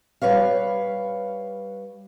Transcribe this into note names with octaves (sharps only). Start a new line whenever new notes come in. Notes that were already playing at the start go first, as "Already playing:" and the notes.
G3 B4 C#5 F5